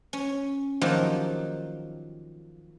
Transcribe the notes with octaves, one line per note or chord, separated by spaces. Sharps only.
C#4
D#3 F3 F#3 A#3 G4